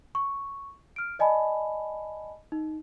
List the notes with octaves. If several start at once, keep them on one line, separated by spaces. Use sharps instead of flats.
C#6
F6 D7
D5 D#5 G#5 A5 B5
D#4